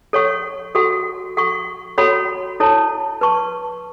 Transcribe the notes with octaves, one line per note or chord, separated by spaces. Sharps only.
A4 C#5 F#5 C#6
F#4 A4 F#5 C#6
A4 F#5 C#6
F#4 A4 C#5 F#5 B5
E4 A4 C#5 A5
B4 A5 C#6